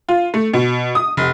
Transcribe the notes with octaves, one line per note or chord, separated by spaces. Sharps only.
F4
A3
B2
D#6
F1